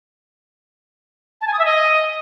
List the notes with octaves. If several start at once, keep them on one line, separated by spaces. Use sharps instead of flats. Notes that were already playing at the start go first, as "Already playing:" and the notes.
A5
G#5
D#6
E5
D#5